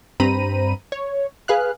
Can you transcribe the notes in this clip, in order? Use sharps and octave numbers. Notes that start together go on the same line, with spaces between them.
G2 C4 C5 A#5 B5 D#7
C#5
G#4 B4 F5 F6 F#6